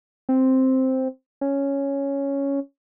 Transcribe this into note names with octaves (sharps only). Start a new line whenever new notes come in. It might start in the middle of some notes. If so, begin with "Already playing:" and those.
C4
C#4